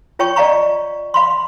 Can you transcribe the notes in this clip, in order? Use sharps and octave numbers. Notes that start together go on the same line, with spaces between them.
F4 C#5 G5 A5 C#6
D5 D#5 F5 A5 A#5 C#6
F5 B5 C6